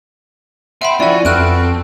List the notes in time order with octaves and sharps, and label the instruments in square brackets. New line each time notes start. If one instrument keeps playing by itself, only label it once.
[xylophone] E5 F#5 B5 [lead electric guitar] G5 C6
[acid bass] F3 [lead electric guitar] C#4 [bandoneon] E4 F#4 [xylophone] D5 G#5
[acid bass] F2 [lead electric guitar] C4 [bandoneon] F#4 A4 B4 [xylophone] F6 F#6 D7